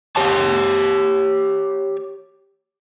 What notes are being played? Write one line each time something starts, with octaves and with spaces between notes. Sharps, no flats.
G4 C#5 A5